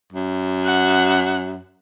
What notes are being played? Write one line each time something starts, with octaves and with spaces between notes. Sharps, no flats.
F#2
F#5